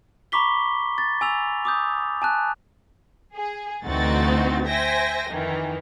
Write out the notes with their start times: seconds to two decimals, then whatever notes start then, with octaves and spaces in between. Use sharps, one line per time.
0.32 A#5 B5 C#6 D6 B6 G7
0.98 A6
1.21 G#5 E6 F7
1.65 D6 D#6 G6
2.22 G#5 A5 F#6
3.35 G#4
3.85 D2 E3 C4 D#4 F#4 A6
4.66 C5 E5 G5 G#5 A#6
5.30 F2 D#3 E3